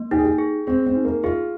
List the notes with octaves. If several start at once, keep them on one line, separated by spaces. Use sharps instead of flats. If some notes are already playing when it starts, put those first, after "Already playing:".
Already playing: A#3
D#4 G4
G#4
G4
G#4
C4 G#4
C4
D#4
A#3
F4 G#4